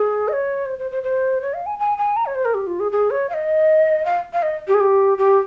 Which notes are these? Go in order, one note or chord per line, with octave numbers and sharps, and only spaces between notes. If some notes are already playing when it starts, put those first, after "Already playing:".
Already playing: G#4
D#5
C#5
C5
C5
C5
C5
C#5
F5
G#5
G#5
G#5
A#5
C#5
C5
A#4
G4
F4
G#4
G#4
C#5
F5
D#5
F5
F5
D#5
G4
G#4
G4
G4